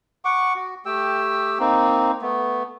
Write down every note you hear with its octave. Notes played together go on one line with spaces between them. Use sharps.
F#5 C#6 D6
F#4
A3 G4 G5 E6
A#3 C4 D#4
A3 B3